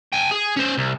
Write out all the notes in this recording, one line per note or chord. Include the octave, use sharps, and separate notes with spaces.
G5 G#5
G#4
C#4 C5
C2